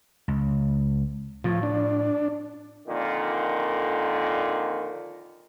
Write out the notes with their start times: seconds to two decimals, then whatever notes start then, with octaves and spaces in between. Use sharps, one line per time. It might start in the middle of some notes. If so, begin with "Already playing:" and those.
0.28 C#2
1.44 A2 F3
1.63 D4
2.87 F2 A#2 D3 D#3